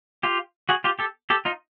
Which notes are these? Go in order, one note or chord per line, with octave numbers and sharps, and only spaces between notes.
F4 G4
F#4 G#4
F4 G4
G4 A4
G4 A4
D#4 F4